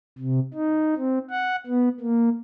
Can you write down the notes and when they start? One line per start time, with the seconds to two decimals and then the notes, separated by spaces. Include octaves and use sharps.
0.18 C3
0.54 D#4
0.97 C4
1.30 F#5
1.67 B3
2.00 A#3